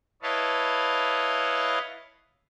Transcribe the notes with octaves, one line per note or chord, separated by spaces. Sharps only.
E4 B4 C#5 D#5 F5 A5